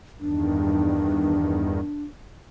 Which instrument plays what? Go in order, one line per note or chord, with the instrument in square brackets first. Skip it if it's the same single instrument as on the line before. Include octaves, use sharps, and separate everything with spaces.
[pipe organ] E2 G2 D#3 [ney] D4